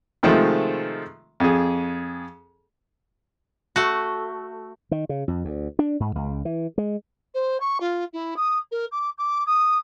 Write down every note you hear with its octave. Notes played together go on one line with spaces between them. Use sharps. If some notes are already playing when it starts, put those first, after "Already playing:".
C3 D#3 F3 G#3 A3
F2 G#4
A3 F#4
D#3
C#3
F2
D2
D4
G#2
C#2
E3
G#3
C5
C#6
F4
E4
D#6
A#4
D6
D6
D#6